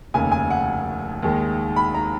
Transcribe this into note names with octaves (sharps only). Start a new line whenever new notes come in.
F1 D#2 C#3 G#5
G#5
F#5
D#2 D#3 G#3
B5
A#5